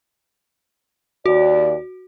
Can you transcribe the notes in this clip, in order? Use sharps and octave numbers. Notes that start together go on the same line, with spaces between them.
D#2 F#4 D5